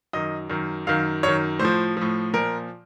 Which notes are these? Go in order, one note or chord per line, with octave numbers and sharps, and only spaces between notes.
F#2 D#3 D#5
F#2 D#3
F#2 D#3 F5
F#2 D#3 C#5
A2 C5
F3
A2 F3
A#2 F3 A#4